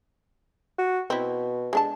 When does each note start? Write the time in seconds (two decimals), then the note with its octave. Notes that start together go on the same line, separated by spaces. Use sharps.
0.78 F#4
1.10 B2 C4 E4
1.73 G#3 D4 A5